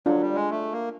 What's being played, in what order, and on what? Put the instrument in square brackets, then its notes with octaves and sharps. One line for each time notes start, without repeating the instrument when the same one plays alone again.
[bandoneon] F#3 [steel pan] D4 F4 A4
[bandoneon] G3
G#3
A3
A#3